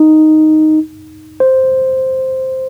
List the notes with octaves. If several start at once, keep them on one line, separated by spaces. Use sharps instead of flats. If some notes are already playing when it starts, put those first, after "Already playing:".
Already playing: D#4
C5